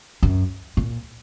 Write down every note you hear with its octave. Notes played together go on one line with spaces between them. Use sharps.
F#2
A#2